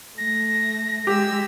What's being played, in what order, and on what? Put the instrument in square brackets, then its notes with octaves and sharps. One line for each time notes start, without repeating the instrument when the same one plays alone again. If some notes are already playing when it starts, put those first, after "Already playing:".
[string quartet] A3 [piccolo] A#6
[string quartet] G#3 E6 [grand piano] G4